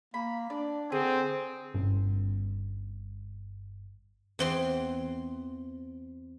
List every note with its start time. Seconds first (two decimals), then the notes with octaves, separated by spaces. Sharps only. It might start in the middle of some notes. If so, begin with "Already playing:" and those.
0.14 A#3 B5
0.50 D4 D5
0.92 D3 C4 G#4
1.74 G1 G2 C#4
4.39 E2 C4 C6